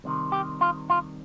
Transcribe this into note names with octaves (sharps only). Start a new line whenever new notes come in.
C2 C3 D#3
G4
F4
F4